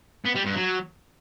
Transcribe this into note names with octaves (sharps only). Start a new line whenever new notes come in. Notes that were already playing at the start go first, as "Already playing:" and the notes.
B3
G3
G2
F#3